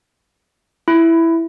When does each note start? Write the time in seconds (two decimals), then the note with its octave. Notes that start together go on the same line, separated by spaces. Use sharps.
0.88 E4